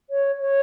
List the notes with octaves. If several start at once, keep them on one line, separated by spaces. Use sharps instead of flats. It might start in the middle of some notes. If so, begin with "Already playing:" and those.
C#5
C#5